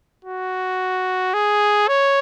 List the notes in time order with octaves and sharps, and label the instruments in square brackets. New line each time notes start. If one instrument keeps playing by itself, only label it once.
[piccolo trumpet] F#4
G#4
C#5